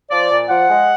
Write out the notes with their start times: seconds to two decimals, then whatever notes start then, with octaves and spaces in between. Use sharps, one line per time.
0.10 F3 D5
0.30 A#2
0.49 F3 F#5
0.70 G#3